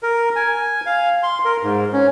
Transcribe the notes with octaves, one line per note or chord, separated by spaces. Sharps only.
A#4
G#5
F5
C6
A#4
G#2
C#4